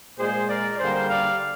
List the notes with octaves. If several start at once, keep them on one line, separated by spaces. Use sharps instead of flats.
A#2 G#3 G#4 C5
A#4 D5
D3 G3 A#3 G#4 C5
D5 F5